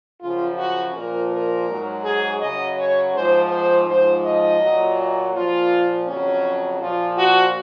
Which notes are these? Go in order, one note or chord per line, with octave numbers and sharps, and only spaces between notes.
F#2 C#3 F3 F4
F#4
A#2 F3 A#4
A#4
G#2 F#3
G#4
F#2 C#3 F#3 D#5
C#5
G#2 F3 C5
C5
G#2 F3 C5
D#5
A#2 F#3
A#2 F3 F4
F2 C#3 F#3 C#4
A#2 F3 F4
F#4